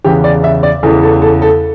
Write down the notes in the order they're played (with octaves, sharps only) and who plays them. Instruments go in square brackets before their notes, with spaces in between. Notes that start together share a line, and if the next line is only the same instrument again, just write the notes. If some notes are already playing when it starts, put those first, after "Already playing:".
[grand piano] E2 C#3 E3 G4
D5
E5
D5
E2 C#3 E3 A4
A4
A4
A4